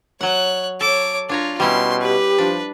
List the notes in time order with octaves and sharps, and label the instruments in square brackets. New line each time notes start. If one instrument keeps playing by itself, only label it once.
[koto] F#3 F#5 [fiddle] C#5 F#6
[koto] A4 [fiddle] C#5 D6
[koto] D4 C#5 A#5 [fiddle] F4
[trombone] B2 [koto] G3 C#4 E4 [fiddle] C6
[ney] G4 [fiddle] B4
[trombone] F3 [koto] D4